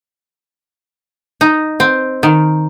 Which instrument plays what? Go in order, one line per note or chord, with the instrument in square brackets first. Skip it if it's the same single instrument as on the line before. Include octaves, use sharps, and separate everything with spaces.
[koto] D#4
C4
D#3